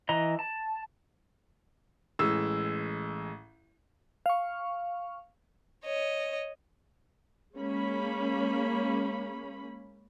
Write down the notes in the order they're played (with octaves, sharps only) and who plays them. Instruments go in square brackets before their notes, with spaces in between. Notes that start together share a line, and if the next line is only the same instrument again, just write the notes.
[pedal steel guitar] E3 D#5 A#5
A5
[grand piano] A1 G#3 E6
[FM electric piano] F5 C#6
[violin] C#5 D#5
[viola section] G#3 A#3 C#4 B5